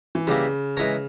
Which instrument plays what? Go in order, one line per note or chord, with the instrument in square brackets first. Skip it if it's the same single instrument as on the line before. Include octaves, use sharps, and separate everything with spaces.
[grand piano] E3
[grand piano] C#3 [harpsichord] E3 G3 A#3 E4
[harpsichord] E3 G#3 E4 A#4 C#5